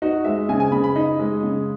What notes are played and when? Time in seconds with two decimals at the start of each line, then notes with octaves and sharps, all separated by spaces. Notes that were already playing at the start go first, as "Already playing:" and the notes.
0.02 D#4 F#4
0.25 G#3 E5
0.49 C#3 G#5
0.60 G#5
0.71 C#3 B5
0.84 B5
0.96 D#4
1.19 G#3
1.43 C#3